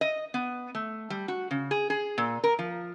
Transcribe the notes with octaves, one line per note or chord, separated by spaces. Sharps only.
D#5
B3
A3
G3
F#4
C#3
G#4
G#4
A#2
A#4
F3